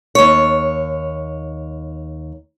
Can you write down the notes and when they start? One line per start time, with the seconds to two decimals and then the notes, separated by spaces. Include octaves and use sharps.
0.15 D#2 C#5